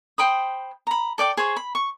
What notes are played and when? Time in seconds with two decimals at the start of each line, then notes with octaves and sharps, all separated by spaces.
0.18 C5 G5 B5 D#6
0.87 A#5 B5
1.18 A4 D5 G5 D6
1.37 G#4 C5 C#5
1.56 B5
1.75 C#6